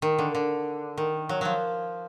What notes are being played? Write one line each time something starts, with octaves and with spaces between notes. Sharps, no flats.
D#3
D3
D3
D#3
F#3
F3 F#3